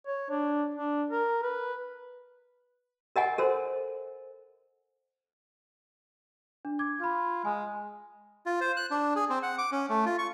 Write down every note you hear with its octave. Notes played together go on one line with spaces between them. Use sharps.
C#5
D4
D4
A#4
B4
A#4 D#5 F#5 G#5
A4 A#4 C5
D4
D6 G#6
F4 B5 G#6
G#3 G#5
F4
C5
F#6
D4
G#4
C4
F#5
D6
C#4
A3
F4
C#6